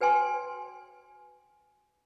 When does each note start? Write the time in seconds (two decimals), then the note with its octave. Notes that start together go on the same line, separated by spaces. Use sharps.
0.01 F#4 B4 G5 G#5 C6